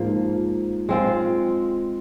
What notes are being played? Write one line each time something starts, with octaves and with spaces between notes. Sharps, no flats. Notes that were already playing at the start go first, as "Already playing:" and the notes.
Already playing: G#2 F3 A#3
G#3 C4 F4